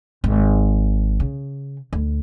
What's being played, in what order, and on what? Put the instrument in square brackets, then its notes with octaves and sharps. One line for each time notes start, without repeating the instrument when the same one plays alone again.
[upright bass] G#1
C#3
D2